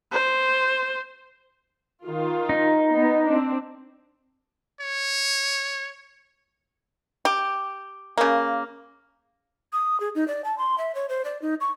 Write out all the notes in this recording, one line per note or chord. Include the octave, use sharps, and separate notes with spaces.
C5
D#3 F4
D#4
B3
C4 D4
C#5
G4
C#3 A#3
D#6
G#4
D#4
D5
A5
C6
E5
C#5
C5
D5
D#4
C#6